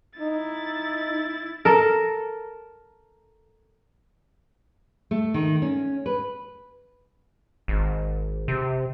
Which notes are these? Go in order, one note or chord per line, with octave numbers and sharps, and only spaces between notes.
D#4 E4 A6
A4 A#4
A3
D#3
C#4
B4
G#1
C3